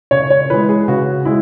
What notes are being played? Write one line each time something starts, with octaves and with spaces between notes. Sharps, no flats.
C#3 C#5
C#5
E3 G#3 B4
G#4
C#3 F#4
G#3 E4